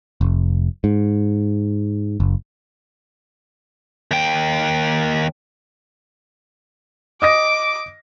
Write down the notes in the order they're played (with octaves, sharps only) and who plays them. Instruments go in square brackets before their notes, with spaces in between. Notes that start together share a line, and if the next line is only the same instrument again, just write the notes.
[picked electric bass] F1
G#2
F#1
[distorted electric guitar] D#2 G5
[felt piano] D#5 D#6 A#6 [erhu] D6